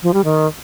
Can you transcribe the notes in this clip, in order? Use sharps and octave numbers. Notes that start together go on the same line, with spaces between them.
F3
G3
D#3